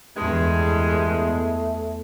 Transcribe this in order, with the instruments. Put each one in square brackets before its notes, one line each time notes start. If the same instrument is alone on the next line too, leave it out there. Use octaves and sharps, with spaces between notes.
[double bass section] E2 [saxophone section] G2 G#3 [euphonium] A3